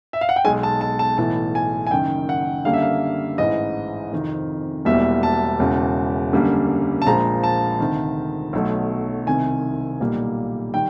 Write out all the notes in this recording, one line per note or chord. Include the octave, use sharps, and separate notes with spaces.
E5
F5
F#5
G5
B1 B2 G#3 G#5
A5
A5
A5
B1 A2 E3 A5
G#5
G#5
F#1 F#2 D#3 G5
F#5
F#2 D3 G3 A#3 F5
E5
F5
A1 G#2 E3 D#5
F2 C3 D#3
E1 E2 B2 G3 A#3 E5
A5
E1 E2 C#3
F#2 D3 G3 A#3
A5
A#1 A#2 F3 G#3 A#5
A5
D2 C3 D#3
B1 B2 F#3 A3
C2 C3 D#3 G#5
B1 A#2 G3 A#3
D#3 G3 G5